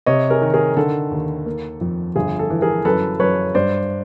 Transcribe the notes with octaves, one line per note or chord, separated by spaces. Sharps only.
C3 C#5 D#5
G#4 A#4
D#3
G#4 A#4
D3 A4
D#2
A#3
F2
G1 G#4
A4
E3
G#4 A#4
F#2 A4 B4
F#2 B4 C#5
G2 C5 D5